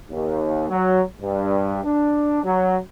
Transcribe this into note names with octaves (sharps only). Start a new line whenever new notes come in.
D#2
F#3
G2
D4
F#3